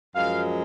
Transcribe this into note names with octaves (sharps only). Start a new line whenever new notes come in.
F#2 F3 G#3 F5